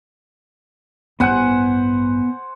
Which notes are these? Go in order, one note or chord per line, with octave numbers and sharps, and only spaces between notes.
A1 G2 B3 C5 F#5 G#5 F#6